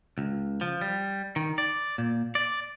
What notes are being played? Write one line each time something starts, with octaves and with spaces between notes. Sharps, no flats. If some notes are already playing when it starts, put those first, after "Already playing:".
C#2
F3
G3
D#3
D5
A#2
D5